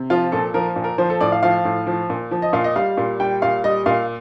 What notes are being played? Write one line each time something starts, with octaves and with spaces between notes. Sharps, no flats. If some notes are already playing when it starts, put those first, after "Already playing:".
Already playing: C3
F3 F4
A#2 A4
F3 A#4
A#2
A#4
F3 C5
A4
A2 D5
F5
F3 F5
A2
F3
A#2
F3
D#5
A#2 F5
D#5
G3 F5
A#2
G3 G5
A#2 F5
G3 D#5
A#2 F5